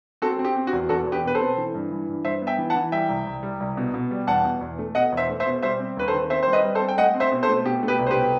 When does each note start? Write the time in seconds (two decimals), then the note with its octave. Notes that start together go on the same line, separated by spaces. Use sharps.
0.22 C4 F#4 A4
0.39 C4
0.45 G4
0.56 C4
0.67 F#4
0.73 E2
0.89 E2 F#4 A4
1.07 E2
1.12 G4 B4
1.24 B2 B4
1.35 A4 C5
1.40 C4
1.57 E3
1.74 G2
1.91 E3
2.08 G2
2.24 G2 C5 E5
2.42 B3
2.47 E5 G5
2.58 E3
2.70 F#5 A5
2.75 E3
2.92 G3 E5 G5
3.09 C2
3.26 C2
3.43 G3
3.60 C2
3.77 B2
3.94 B2
4.11 G3
4.27 E2 F#5 A5
4.44 B2
4.61 E2
4.79 A3
4.95 B2 D#5 F#5
5.12 E2
5.17 C5 E5
5.29 A3
5.40 C5 E5
5.46 B2
5.62 G3 C5 E5
5.80 C4
5.96 D#2 B4
6.08 A4 C5
6.13 D#3
6.30 C4 C5 E5
6.43 G3 C5
6.53 B4 D#5
6.64 G3
6.75 A4 C5
6.81 C4
6.89 G5
6.98 A3 D#5 F#5
7.15 C4
7.20 C5 E5
7.32 B2
7.43 A4 C5
7.49 A3
7.65 B2 G4
7.83 A3
7.88 G4 B4
7.99 C2
8.07 C5
8.11 G4 B4
8.16 B2